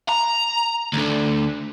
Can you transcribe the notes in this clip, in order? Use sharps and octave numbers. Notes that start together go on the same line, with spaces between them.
A#5
D2 D3